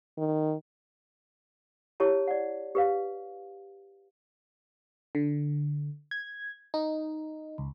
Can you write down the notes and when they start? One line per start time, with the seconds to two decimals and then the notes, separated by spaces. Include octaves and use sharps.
0.18 D#3
2.00 E4 G4 C#5 A5
2.27 D5 F#5
2.75 G4 B4 F5
5.15 D3
6.11 G#6
6.74 D#4
7.58 C#2